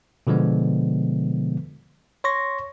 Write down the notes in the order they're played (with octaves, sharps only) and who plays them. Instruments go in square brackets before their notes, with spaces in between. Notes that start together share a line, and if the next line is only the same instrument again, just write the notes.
[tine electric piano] B2 D3 F3 G#3 B3
C#5 C6 C#6 A#6